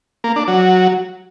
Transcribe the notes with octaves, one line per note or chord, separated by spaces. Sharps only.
A#3
D4
F#3